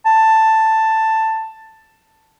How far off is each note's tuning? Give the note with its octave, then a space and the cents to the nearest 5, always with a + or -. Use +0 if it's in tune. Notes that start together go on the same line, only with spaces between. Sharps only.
A5 +10